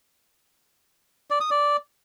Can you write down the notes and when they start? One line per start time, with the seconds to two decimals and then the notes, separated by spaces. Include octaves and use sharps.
1.30 D5
1.41 D#6
1.51 D5